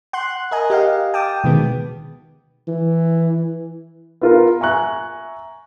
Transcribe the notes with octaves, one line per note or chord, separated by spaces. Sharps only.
F#5 C6 F#6
A#4 D#5 G#5
G4 D#5 F5 F#5
G5 A5 D6 D#6
B2 D#3 G#3 B3
E3
B3 F4 A#4
E5 G#5 A#5 C#6 F#6